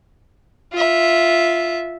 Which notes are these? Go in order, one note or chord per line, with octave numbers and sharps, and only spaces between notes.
F4 E5